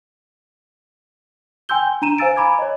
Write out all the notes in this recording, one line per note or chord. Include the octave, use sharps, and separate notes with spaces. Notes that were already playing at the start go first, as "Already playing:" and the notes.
G5 G#5 C6 E6 G6 G7
D4 A#5 D#7 E7
C5 F5 G#5 E6 A6 D7
G#5 A#5 B5 D6 G#6
C#5 D#5